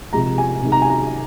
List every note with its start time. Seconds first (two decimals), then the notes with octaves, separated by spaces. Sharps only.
0.13 C3 F3 G#3 A#5
0.38 G#5
0.62 C3 D#3 G#3
0.72 A#5
0.82 G#5
0.90 A#5